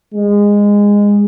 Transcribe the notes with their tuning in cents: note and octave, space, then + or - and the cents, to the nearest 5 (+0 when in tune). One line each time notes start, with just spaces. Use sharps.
G#3 -20